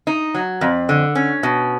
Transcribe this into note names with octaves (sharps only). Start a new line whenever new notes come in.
D#4
F#3
F2
D3
C#4
B2